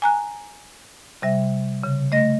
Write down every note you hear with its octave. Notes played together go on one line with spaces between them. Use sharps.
G#5 A#5 F#6
C3 G3 E5
C#3
A3 D#5 A#6